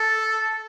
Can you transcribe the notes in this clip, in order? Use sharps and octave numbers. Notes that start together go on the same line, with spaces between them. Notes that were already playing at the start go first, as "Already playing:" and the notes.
Already playing: A4